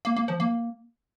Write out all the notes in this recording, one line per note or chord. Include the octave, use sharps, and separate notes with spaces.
A#3
A#3
F3
A#3